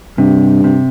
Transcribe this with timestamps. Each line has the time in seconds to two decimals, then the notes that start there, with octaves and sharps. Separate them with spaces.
0.18 G2 C3
0.64 C3